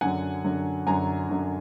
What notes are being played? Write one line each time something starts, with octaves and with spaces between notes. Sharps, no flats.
F#2 D3 F#3 F#5 G#5
F#2 D3 F#3
F#2 D3 F#3 G#5 A#5
F#2 D3 F#3